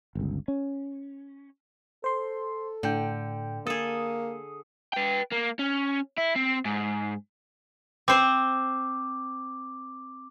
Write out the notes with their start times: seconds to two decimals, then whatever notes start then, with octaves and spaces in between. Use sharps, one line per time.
0.15 G1 C#2
0.48 C#4
2.04 A4 C5 C6
2.83 A2 D3 G5
3.67 A#3 G#4 A4 D#6
4.93 B4 G5
5.32 A#3
5.59 C#4
6.18 E4
6.36 C4
6.65 G#2
8.08 C4 C5 D6